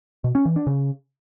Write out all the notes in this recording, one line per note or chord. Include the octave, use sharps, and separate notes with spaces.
B2
C#4
E3
D4
C#3